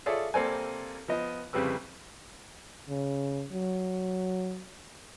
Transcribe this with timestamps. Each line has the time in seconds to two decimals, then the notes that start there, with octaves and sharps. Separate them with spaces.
0.06 F4 G#4 A4 C#5 D5 E5
0.34 C2 A#3 C4 A4 D5 G#5
1.08 F3 B3 D#5
1.53 C2 F2 C#3 G3 B4 E6
2.89 C#3
3.52 F#3